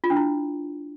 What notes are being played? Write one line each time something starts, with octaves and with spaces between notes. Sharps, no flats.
F4
D4
E4